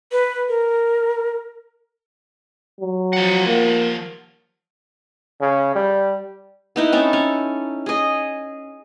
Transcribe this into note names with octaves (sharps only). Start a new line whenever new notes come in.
B4
A#4
F#3
F3 F#5
A#3
C#3
G3
B3 D#4 E4
C4 C#4 A4
C#4
G#4 D#5